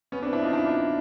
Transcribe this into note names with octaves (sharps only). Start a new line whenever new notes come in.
B3 C#4
C4 D4
D4 E4
D#4 F4
D4 E4